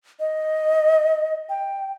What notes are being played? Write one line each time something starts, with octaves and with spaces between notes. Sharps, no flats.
D#5
G5